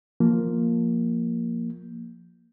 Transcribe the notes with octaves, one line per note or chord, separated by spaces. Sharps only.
F3 A#3